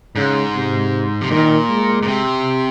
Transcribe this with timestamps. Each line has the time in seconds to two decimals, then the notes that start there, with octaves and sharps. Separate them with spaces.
0.16 G#2 C#3
0.54 C3
1.21 C3
1.31 A#2 D#3
1.69 G#3
2.02 A#2
2.07 C3